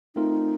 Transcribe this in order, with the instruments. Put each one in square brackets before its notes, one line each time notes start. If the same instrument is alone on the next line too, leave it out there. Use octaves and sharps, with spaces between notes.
[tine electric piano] A3 C4 F4 A#4 [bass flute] D#4